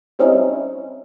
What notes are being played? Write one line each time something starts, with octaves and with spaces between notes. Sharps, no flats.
G3 C4 C#4 D#4 E4